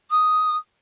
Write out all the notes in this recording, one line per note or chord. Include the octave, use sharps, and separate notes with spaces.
D#6